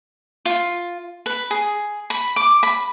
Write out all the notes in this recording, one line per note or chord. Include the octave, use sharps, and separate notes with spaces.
F4
B4
G#4
B5
D6
B5